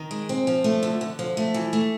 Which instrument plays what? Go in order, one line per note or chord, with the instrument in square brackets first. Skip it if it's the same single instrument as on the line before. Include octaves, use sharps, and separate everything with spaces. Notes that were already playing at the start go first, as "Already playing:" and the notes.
Already playing: [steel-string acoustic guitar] D#3
G#3
C4
F3
A3
D3
D3
F3
A3
E3
A3